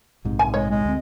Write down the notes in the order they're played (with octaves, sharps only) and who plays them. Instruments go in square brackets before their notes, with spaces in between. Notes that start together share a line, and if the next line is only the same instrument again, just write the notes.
[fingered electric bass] A#1 G#2 C3
[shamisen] G#5
[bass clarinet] G#3 [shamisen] C#5
[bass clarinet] G#3
[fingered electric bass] D2 C4